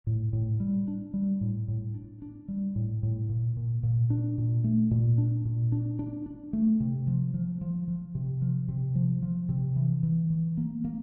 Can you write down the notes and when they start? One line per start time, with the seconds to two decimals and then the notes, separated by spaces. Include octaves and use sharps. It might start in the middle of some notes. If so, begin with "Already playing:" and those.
0.07 A2
0.33 A2
0.60 G3
0.88 D4
1.14 G3
1.41 A2
1.68 A2
1.95 D4
2.22 D4
2.48 G3
2.76 A2
3.03 A2
3.29 A#2
3.57 A#2
3.83 A#2
4.10 D4
4.38 A#2
4.64 A3
4.91 A#2
5.18 D4
5.45 A#2
5.72 D4
5.99 D4
6.26 D4
6.53 A3
6.80 C3
7.07 F3
7.34 F3
7.61 F3
7.88 F3
8.15 C3
8.42 F3
8.68 C3
8.95 F3
9.22 F3
9.49 C3
9.76 E3
10.03 E3
10.30 E3
10.57 A#3
10.85 A#3